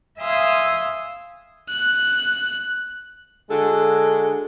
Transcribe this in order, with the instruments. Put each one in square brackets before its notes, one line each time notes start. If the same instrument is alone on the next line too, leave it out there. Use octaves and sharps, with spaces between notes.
[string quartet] E5 F5 G#5 C6 D#6 E6
[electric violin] F#6
[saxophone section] D3 G#3 F#4 A4